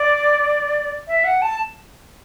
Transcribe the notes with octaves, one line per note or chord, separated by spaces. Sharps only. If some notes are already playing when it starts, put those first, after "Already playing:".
Already playing: D5
E5
F#5
A5